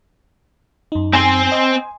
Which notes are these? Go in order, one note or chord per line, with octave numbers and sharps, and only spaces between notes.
F#2 D#4
C4 C5 G#5
D#5 C6